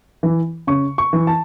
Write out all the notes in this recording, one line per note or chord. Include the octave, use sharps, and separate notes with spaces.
E3
C#3 C#6
C#6
E3
A5